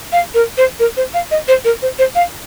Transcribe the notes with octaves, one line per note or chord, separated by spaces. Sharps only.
F5
A#4
C5
A#4
C5
F5
D#5
C5
A#4
C5
C5
F5